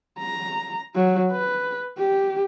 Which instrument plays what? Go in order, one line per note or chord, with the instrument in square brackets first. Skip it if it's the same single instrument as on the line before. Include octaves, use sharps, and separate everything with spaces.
[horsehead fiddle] A#5
F#3
B4
G4